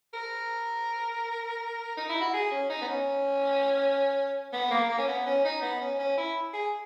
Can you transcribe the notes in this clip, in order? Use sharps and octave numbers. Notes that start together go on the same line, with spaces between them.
A#4
D#4
E4
F#4
G#4
C#4
D#4
B3
C#4
B3
A#3
A#3
C#4
B3
C#4
D#4
B3
C#4
C#4
E4
G#4